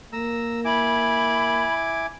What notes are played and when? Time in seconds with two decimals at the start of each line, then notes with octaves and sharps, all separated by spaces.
0.13 A#3 A#5 E6
0.65 E4 G#5 B5 D6